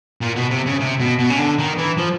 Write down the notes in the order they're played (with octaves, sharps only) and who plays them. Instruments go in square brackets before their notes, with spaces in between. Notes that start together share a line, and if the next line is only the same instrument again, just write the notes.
[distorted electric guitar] A#2
B2
C3
C#3
C3
B2
B2
C#3
D3
D#3
E3
F3